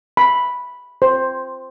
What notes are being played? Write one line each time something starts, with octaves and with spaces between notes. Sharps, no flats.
B5
C5